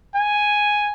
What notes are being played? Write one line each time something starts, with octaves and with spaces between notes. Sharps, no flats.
G#5